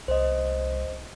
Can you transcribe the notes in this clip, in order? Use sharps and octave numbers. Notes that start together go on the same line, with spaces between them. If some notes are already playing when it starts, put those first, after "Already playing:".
C2 C5 D#5